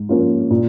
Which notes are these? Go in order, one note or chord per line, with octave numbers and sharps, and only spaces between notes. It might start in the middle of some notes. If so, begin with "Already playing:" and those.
Already playing: G#2
F3 A#3 C#4 F4
A#2